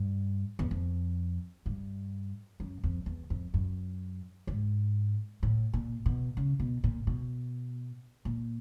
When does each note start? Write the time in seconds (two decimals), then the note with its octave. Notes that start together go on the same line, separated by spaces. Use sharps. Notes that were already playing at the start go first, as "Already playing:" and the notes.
Already playing: G2
0.59 E2
0.71 F2
1.66 G2
2.60 F#2
2.84 F2
3.06 E2
3.30 F2
3.54 F#2
4.47 G#2
5.43 A2
5.74 A#2
6.06 B2
6.37 C#3
6.60 B2
6.84 A#2
7.07 B2
8.25 A#2